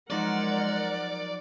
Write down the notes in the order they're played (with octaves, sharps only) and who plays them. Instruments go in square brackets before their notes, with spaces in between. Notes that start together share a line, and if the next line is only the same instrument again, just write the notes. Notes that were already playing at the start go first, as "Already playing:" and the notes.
[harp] F3 F#3 D#4 [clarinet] G#3 [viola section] A#4 F#5 [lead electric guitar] D5